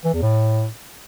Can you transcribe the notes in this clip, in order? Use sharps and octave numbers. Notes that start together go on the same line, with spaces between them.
E3
E2
A2